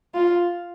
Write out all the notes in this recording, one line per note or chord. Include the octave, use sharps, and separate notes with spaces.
F4